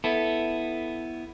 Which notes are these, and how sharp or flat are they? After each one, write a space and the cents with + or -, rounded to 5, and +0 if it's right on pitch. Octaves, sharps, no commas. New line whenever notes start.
B3 +5 E4 +0 A4 +0